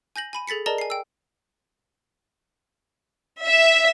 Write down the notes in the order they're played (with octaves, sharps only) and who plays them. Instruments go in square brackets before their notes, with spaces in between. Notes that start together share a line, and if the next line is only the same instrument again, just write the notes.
[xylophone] G#5 G6 A#6 F#7
G#5 B5 D#7
G#4 A4 A6 B6 C#7
G#4 A#4 D5 D#5 A5 A#5
G#5 C7
G5 E6
[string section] E5